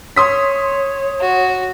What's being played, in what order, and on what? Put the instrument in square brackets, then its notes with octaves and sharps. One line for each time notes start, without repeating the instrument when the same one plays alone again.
[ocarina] C#5 [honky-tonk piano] C6 D#6 B6
[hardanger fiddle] F#4